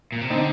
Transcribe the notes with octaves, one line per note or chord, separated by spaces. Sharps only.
A#2
C3
D3 C4 D#4